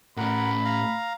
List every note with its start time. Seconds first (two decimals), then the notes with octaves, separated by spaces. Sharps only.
0.17 A2 C#4 A#4 F#5 B5
0.65 F5 A#5